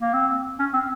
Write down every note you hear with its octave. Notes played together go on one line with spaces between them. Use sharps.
A#3
C4
C#4
C4